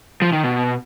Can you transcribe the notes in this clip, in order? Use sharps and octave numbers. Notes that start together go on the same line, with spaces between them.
F3
D#3
B2